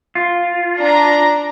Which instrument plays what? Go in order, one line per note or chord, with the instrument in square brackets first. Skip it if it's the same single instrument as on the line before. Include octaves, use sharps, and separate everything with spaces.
[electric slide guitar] F4
[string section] D4 A#5